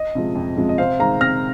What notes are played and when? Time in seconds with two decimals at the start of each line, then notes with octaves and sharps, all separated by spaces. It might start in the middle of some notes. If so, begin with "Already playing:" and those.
Already playing: D#5
0.15 C3 F3 G#3
0.35 F2
0.57 C3 F3 G#3
0.69 D#5
0.78 C3 C5 F5
0.99 D#3 G#3 F5 A#5
1.21 C3 F6 A#6